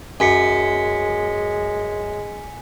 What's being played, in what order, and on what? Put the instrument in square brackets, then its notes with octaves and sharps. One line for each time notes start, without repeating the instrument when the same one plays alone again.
[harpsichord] F#2 [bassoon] G#3 [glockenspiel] G#5 B6 C#7